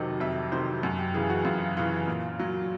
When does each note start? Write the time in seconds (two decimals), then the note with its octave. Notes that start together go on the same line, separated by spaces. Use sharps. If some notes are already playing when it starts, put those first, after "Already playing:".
Already playing: F2 C3 D#3 F#3 A4 D#5
0.20 F2 E5
0.52 C3 D#3 F#3 C5
0.82 F#2 F#4
0.99 G4
1.14 C#3 E3 G#4
1.30 F#4
1.45 F#2 F4
1.77 C#3 E3 F4
2.08 A#2
2.39 F#3